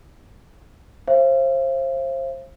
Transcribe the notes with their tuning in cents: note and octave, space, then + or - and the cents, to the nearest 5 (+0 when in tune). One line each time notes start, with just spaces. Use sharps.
C5 +30 F5 -45